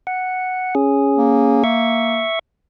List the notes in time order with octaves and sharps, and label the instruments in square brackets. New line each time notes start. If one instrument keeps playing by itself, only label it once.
[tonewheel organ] F#5
C#4 G#4
[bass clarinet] A#3
[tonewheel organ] E5 C#6